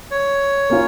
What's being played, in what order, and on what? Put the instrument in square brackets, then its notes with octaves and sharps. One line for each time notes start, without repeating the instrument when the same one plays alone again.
[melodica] C#5
[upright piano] A#3 C#4 F4